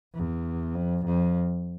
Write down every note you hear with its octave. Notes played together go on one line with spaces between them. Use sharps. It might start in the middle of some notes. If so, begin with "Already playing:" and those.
E2
F2
F2